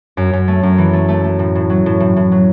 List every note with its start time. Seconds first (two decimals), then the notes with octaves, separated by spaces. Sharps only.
0.17 F#2
0.33 F#2
0.48 A3
0.63 F#2
0.78 E3
0.93 A3
1.08 A3
1.24 A3
1.39 A2
1.55 A2
1.70 F#3
1.86 A2
2.00 A2
2.16 A2
2.32 F#3